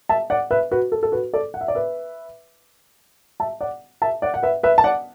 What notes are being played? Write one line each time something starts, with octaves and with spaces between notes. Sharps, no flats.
E5 A5
D5 F#5
B4 E5
F#4 B4
A4
A4
F#4 B4
A4 D5
F#5
E5
D5
B4 E5
E5 A5
D5 F#5
E5 A5
D5 F#5
F#5
B4 E5
B4 E5
A5
D5 F#5